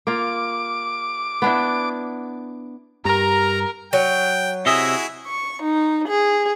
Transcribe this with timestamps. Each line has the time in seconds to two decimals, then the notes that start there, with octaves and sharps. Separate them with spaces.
0.07 A#3 F4 D6
1.42 B3 D4 E4
3.05 G2 G4 A#4 A#5
3.93 F#3 G5
4.66 C3 E4 F#4 G#4 D#5 E5
5.27 C#6
5.62 D#4
6.07 G#4